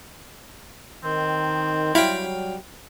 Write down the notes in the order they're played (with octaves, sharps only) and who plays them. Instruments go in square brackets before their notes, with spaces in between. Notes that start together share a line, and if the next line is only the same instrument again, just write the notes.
[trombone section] D#3 [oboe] C4
[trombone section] F#3 G3 [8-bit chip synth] E4 [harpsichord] F5 G5